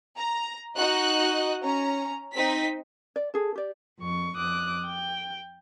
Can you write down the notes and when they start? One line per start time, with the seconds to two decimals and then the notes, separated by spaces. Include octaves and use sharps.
0.18 A#5
0.77 D#4 F#4 D#5 F#6
1.62 C#4 A#5
2.33 C4 D#4 B6
3.16 D5
3.34 G#4 A4
3.56 G4 D5
3.99 F2 C#6
4.36 F2 D6 D#6 F#6
4.84 G5